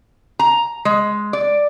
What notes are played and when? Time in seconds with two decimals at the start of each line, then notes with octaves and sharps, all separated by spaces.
0.39 A#5
0.85 G#3
1.33 D5